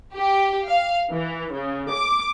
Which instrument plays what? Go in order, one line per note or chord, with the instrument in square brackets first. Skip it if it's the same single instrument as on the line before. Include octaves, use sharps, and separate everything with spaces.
[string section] G4
F5
E3
C#3
D6